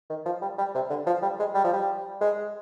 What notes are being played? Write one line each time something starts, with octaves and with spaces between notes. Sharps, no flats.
D#3
F3
G3
G3
C3
D3
F3
G3
G#3
G3
F3
G3
G#3